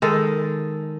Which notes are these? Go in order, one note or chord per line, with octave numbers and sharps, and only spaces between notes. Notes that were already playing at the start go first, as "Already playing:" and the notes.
D#3 G#3 A4